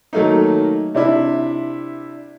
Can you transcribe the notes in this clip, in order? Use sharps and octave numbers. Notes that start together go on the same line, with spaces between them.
D#3 F#3 A3 A#3 D#4
C3 D4 E4